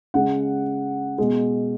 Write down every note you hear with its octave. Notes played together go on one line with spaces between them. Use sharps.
C#3 G#3 F#5
B2 G#3